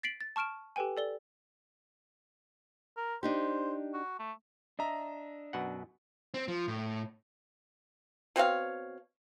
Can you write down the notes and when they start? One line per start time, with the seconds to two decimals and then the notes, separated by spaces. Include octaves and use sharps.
0.03 A6 B6 C7 D7 F#7
0.21 A6
0.36 A5 C#6 F6 D7 E7
0.76 G4 A4 B4 G5 G#5
0.97 A4 D5 G7
2.97 A#4
3.23 D4 D#4 G4 C5
3.94 F#4
4.19 A3
4.79 D4 D#5 E5 A#5
5.53 F#2 B2 F#5
6.34 C4
6.48 F3
6.68 A2
8.36 B2 C4 C#5 F5